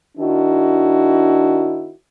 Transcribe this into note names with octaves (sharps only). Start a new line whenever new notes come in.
D#3 D4 E4 F#4